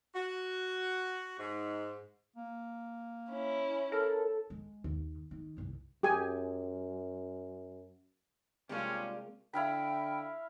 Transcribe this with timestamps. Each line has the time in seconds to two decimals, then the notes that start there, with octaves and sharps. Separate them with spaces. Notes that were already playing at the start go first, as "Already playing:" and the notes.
0.15 F#4
1.39 G#2
2.36 A#3
3.29 C#4 E4
3.92 A4 A#4
4.50 G#3
4.84 D#2
5.31 D#3
5.57 F#1 C2
6.03 F#2 G4 G#4 G#5
8.69 C3 G3 G#3 A#3 C#4 D4 F4
9.53 D3 E4 F5 G5 B5